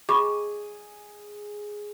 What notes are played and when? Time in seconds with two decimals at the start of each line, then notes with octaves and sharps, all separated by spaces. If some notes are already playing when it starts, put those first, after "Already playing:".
0.09 G#4 B5 C#6 D6